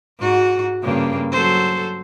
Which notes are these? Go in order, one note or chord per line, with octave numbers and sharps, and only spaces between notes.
G#2 F#4
G2 C#3 A#3
F#3 A4 C5